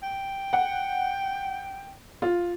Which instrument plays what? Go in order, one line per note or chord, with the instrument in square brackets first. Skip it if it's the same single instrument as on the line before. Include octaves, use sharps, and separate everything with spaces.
[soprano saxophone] G5
[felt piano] F#5
F4